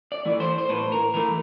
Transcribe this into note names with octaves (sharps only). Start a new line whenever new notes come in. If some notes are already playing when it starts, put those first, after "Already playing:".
D5
E3 A3
C5
C5
A2 B4
A#4
E3 A3 A#4